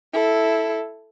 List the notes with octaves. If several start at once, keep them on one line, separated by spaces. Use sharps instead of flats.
E4 A4